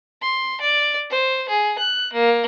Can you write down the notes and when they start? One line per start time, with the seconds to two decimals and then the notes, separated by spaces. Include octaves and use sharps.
0.22 C6
0.61 D5
1.10 C5
1.49 G#4
1.78 F#6
2.13 A#3